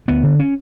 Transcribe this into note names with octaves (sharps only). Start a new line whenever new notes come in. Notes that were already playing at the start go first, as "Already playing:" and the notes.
D2 B3
D3
C#4